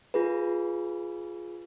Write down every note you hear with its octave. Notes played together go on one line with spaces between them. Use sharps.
F4 G#4 B4